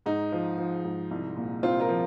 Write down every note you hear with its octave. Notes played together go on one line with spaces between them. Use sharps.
G#2 D#4
F3
F3
G#2
C2
A#2
C2 C4 F4
F4 A#4
F3